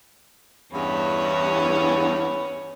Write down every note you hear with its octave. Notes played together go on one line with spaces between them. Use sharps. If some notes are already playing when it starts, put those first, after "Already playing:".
E2 G2 C#4 B5